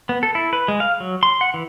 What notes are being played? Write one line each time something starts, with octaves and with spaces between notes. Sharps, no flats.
B3
A4
E4
B4
G#3
F5
F#3
C6
F#5
E3